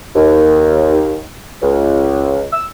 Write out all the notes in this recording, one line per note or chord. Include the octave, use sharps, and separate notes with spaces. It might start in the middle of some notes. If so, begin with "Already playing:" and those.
D#2
C#2
E6